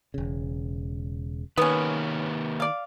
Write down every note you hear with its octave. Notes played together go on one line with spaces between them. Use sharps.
E1 C#3
D#3 A#3 B3 C#4 G4 B4
D5 F5